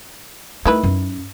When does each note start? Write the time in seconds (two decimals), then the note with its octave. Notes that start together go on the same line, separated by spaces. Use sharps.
0.66 D#3 A3 E4 B4
0.83 F#2